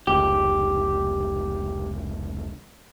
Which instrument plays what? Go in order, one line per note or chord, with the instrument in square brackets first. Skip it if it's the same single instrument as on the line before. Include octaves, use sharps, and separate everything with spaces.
[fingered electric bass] F1 C#2 [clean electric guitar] G4